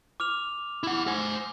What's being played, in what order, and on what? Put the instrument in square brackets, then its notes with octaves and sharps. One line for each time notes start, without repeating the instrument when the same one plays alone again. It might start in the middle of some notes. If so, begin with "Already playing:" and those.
[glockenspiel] D6 F6 F7
[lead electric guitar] E4 F#5
C5 G#5